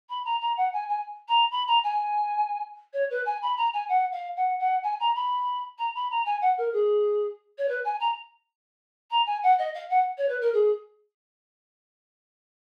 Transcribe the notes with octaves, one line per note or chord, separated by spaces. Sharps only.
B5
A#5
A#5
F#5
G#5
G#5
A#5
B5
A#5
G#5
C#5
B4
G#5
B5
A#5
G#5
F#5
F5
F#5
F#5
G#5
A#5
B5
A#5
B5
A#5
G#5
F#5
A#4
G#4
C#5
B4
G#5
A#5
A#5
G#5
F#5
D#5
F5
F#5
C#5
B4
A#4
G#4